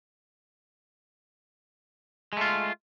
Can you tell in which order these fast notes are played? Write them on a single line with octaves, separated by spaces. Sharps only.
G#3 A3 F4